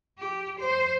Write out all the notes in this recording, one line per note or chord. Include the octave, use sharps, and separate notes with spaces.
G4
C5